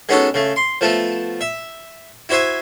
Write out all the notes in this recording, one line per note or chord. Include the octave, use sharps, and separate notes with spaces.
G#3 B3 C#4 D#4 F#4 A4
C#3 A3
C6
F3 A3 B3 A4
E5
E4 F#4 C5 E5 G#5